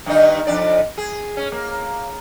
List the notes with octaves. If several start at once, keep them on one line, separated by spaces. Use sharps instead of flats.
G2 D#3 D#4
F2 D4 D5
G#4
C#4
A#3